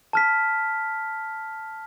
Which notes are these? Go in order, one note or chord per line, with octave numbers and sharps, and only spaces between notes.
A5 F6 B6